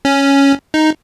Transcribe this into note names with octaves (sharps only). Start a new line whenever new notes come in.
C#4
D#4